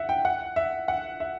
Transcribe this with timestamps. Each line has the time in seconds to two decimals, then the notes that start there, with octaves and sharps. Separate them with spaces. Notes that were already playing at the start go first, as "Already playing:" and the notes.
Already playing: E5 F#5
0.09 G5
0.25 F#5
0.56 E5
0.88 F#5
1.20 E5